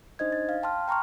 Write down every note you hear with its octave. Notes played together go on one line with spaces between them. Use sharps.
D4 D#4 C5 D#5 G#6
A6
F5
G5 A5 C6 F6
G5 A#5 C6 C#6 F6